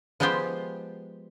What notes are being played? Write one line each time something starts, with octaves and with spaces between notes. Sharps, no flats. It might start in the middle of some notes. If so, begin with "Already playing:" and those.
F3 G#3 B3 G4 C5 G5